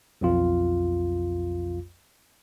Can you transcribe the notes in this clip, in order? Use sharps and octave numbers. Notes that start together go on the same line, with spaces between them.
B1 F2 F4